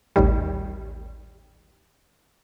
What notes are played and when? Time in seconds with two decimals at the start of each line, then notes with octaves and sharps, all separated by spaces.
0.16 A1 D#2 D#3 G3